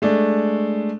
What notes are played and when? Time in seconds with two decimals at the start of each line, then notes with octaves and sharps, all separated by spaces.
0.02 G#3 A3 D4